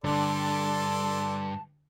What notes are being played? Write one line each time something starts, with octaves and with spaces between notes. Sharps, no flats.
G2 D3 D4 A4 D5 A5 C6